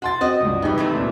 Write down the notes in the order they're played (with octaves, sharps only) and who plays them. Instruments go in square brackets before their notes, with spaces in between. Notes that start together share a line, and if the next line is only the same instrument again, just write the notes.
[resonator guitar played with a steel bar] F#4 [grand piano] F#5 C6 A6
[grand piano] C4 [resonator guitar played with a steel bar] F#4 D#5
[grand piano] C#2 G2
[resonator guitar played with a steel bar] B2 E3 [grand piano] D#4 G4 B4
[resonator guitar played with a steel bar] C3 E3 A3
[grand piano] C2 A#2